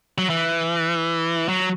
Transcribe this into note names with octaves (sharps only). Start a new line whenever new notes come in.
F#3
E3
F#3